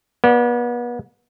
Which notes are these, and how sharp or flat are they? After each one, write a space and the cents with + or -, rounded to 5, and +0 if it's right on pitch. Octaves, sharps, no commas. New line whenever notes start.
B3 -35 D5 +0